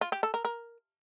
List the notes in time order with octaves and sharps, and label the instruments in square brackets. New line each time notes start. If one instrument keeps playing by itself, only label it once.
[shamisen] F4
G4
A4
A#4
A#4